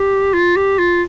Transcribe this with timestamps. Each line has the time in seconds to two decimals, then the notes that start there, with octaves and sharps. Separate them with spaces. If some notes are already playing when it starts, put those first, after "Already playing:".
Already playing: G4
0.34 F4
0.56 G4
0.79 F4